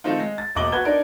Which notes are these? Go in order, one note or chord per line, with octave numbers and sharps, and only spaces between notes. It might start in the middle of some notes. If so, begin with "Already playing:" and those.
D#3 A3 C4 D#4 F4
G#3
A6
E1 A#3 D#5 D6 F#7 G7
F#4 B4 G#6 G7
D4 D#4 A#4 D5